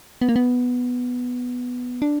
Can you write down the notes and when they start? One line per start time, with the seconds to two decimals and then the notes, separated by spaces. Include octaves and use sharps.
0.21 B3
0.29 A#3
0.36 B3
2.02 D4